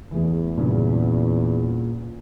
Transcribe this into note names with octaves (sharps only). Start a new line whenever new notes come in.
E2 E3 A3 G#4
G2 A#2 C#3 F#3